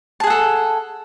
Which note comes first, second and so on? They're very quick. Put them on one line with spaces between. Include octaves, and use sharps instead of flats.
A5 G#4 F#5 A4